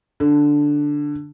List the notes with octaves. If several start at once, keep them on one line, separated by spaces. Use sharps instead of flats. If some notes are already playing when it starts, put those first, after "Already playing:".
D3